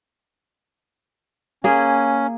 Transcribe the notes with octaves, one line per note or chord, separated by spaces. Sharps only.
A#3 C#4 G#4